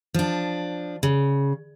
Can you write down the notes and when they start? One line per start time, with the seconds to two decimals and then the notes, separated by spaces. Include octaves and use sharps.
0.14 F3 D4
1.03 C#3